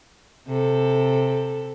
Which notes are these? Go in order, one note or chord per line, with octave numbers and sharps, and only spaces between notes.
C3 A4